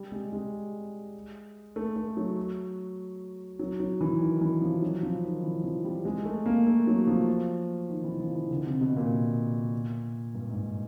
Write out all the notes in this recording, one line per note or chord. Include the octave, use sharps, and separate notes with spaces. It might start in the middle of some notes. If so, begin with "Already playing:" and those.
Already playing: G3
G#3
G#3
A3
A3
F#3
F#3
F#3
E3
D#3
E3
F3
F#3
F3
D#3
E3
F3
G3
G#3
A3
A#3
A3
F#3
F3
D#3
E3
F3
E3
D3
C3
B2
A#2
G2
G#2